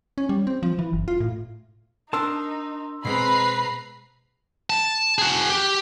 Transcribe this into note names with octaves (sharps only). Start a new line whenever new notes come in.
C#4
G3
C4
F3
E3
F#1
F4
A2
D4 D#4 A#4 A5 C6 E6
B2 G#3 C4 B4 A#5 B5 C7
A5
F#4 G#4
G4